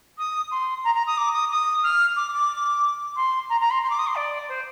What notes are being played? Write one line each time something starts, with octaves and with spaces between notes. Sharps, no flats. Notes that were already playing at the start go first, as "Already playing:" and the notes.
D#6
C6
A#5
A#5
D#6
D6
D#6
D#6
F6
D6
D6
C6
A#5
A#5
C6
C6
D6
D#6
C6
D5
C5